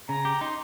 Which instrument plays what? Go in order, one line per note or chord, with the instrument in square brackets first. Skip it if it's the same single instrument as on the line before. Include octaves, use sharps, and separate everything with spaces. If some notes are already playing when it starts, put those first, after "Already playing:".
[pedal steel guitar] C#3 [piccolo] A#5
[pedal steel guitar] G4
[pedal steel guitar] D#4 [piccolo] C6